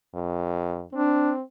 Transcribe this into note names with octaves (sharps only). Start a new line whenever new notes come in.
F2
C4 D4